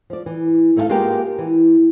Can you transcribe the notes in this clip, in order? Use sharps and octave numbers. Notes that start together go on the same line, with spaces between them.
F3 D5
E3
A3 D#4 E4 F#4 A4 F5
G#3 A#3 B3 F4 G4 A#4
E3